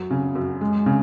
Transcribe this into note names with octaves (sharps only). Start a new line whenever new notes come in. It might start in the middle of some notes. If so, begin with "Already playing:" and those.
Already playing: F#2 F#3
C#3
F#2
G#3
C#3